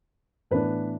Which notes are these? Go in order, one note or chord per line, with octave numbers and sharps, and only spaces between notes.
A2 E3 B3 D4 B4